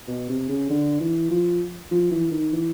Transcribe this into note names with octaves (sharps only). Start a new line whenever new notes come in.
B2
C3
C#3
D3
E3
F3
F3
E3
D#3
E3